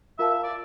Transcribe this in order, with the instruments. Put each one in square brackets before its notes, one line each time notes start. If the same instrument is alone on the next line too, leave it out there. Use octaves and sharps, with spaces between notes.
[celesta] F4 A#4 F5 A5 [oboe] E5
[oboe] E5
D5